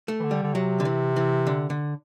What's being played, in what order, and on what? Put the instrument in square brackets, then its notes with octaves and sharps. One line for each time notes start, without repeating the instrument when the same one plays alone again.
[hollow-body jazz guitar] A3
[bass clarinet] E3
D3
[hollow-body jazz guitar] G3
[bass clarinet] D3
[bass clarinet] C3 [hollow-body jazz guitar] F#3
[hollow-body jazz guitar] D3
E3
E3
D3
D3